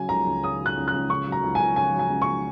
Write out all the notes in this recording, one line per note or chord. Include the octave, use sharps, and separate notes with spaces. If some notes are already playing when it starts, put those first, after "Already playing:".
Already playing: C#3 F#3 G#5
C#2 A#5
C#2
C#3 D#6
F#3
F#6
C#2
F#6
C#2
C#3 C#6
F#3
A#5
C#2
C#2 G#5
C#3 G#5
F#3
G#5
C#2
C#6